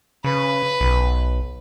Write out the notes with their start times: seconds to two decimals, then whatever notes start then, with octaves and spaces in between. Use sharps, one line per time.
0.24 C#3 B4
0.81 B1